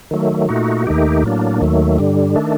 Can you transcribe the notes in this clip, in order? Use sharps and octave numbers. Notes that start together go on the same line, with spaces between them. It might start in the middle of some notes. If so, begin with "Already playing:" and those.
D#3 F#3 A3
A#2 A3 D#4 F#4
D#2 D#3 A3 D#4 G4
A2 F#3 A#3 D4
D#2 D#3 F#3 A3
G2 D3 G3
D#3 A3 D4